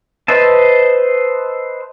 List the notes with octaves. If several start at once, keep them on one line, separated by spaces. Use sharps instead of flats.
B4 C5 D#5 E5 A5